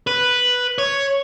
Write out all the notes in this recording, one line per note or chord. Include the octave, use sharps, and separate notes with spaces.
B4
C#5